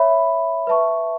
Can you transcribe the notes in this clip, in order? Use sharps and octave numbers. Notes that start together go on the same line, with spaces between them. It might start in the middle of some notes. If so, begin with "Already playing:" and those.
Already playing: C#5 E5 B5
B4 E5 A5 C#6